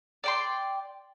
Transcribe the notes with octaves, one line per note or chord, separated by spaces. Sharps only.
D5 G5 C6